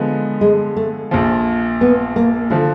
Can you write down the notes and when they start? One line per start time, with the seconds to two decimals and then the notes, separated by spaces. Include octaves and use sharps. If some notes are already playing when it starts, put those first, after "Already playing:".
Already playing: D3 F3 G#3 B3
0.41 G#3
0.76 A3
1.11 A#1 A#2 F3
1.81 B3
2.16 A#3
2.50 D3 F3 A3